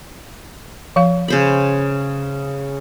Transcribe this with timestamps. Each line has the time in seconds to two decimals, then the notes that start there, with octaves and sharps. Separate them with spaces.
0.96 F3 F5
1.28 C#3 C5 B5